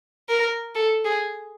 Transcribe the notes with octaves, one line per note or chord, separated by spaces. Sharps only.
A#4
A4
G#4